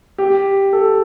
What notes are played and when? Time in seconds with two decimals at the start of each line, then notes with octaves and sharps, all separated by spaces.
0.18 G4
0.73 A4